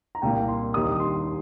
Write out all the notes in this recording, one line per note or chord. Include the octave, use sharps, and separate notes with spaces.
A#5
C2 A#2 A#3 G5
C6
D#2 D#3 G3 D#4 D#6
C6